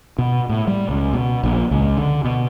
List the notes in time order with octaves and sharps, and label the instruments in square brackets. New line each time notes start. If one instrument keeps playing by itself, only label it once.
[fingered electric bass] B2
A2
G3
C#2
B2
A#1
C#2
D3
B2